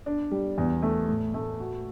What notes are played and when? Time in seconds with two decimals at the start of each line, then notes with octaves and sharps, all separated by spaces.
0.06 D4
0.31 G3
0.58 E2
0.83 A3
1.08 A2
1.34 A3
1.60 F#4